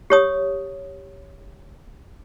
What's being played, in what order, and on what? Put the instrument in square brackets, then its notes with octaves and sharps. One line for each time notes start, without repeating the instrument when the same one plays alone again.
[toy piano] G4 C#5 D#6